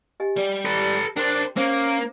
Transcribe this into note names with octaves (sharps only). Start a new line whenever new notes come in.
G4 D#5 G#5
G3 D5
A4 B4
D4 A#4 C5 G5
A#3 C#4 C5